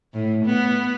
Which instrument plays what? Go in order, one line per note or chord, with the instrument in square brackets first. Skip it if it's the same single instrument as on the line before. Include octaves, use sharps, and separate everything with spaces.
[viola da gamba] A2
B3